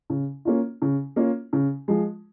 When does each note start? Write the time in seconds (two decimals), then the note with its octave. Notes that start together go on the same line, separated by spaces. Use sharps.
0.10 C#3
0.45 A#3 C#4 F4
0.82 C#3
1.16 A#3 C#4 F4
1.53 C#3
1.88 F3 G#3